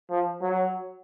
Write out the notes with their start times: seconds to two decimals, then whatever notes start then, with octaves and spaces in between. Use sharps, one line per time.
0.10 F3
0.42 F#3